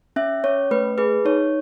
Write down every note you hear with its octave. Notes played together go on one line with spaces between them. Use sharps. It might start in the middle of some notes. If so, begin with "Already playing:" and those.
C#4 E5
C#4 C#5
A3 B4
G#4 B4
D#4 C#5